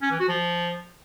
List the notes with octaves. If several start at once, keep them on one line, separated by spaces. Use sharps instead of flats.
C#4
E3
F#4
F3